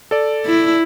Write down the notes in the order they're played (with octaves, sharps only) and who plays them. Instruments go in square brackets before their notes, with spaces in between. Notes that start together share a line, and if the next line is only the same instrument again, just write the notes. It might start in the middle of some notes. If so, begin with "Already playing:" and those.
[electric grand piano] A4 D5
[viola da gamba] E4